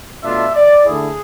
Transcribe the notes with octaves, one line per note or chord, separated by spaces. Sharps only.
B2 A3 D4 F4 E5
D5
D3 A3 E4 G#4